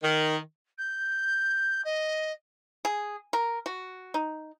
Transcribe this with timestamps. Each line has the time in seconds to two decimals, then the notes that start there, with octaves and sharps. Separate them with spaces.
0.03 D#3
0.78 G6
1.84 D#5
2.85 G#4
3.33 A#4
3.66 F#4
4.14 D#4